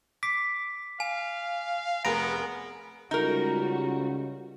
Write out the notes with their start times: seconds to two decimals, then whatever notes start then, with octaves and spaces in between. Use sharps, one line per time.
0.23 D6 B6 C7
1.00 F5 G#5
2.05 F1 B3 G#4 A#4 A#5 D7
3.11 C#2 G3 D#4 F#4 A#4